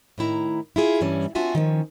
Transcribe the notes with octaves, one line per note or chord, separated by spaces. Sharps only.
A2 D#3 E4 A#5
E4 F4 G#4
G2 E3 G3 C#4
C4 D4 F4 F#4 E5 G#5
D#3 F3 C#4